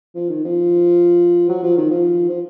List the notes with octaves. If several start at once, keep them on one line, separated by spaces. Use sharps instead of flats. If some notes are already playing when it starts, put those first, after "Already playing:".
F3
D#3
F3
F#3
F3
D#3
F3
F3